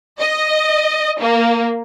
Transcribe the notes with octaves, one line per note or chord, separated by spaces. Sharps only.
D#5
A#3